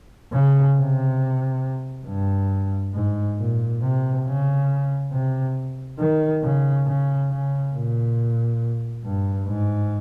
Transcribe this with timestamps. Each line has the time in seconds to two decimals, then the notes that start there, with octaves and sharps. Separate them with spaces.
0.33 C#3
0.76 C3
2.07 G2
2.94 G#2
3.38 A#2
3.82 C3
4.26 C#3
5.12 C3
5.99 D#3
6.43 C#3
6.86 C#3
7.30 C#3
7.74 A#2
9.05 G2
9.48 G#2